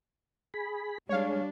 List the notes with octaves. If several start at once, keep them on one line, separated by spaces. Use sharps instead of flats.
G#4 B5
G3 G#3 D4 C#5 F5